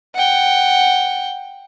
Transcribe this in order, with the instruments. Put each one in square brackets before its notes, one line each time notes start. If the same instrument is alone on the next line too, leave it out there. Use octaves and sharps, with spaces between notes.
[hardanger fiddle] F#5 G5